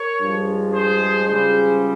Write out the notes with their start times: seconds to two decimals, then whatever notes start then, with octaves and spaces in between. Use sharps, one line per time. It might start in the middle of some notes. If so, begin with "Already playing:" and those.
Already playing: A#4 C#5
0.20 G2 F3 G#3
0.73 G#4 C5
1.27 C#2 C#3 G3 G#4 C5